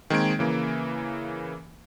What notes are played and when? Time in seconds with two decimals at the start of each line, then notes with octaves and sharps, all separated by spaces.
0.10 D#3 G#3 A#3 C4 G#6 D7
0.39 C#3 E3 A#3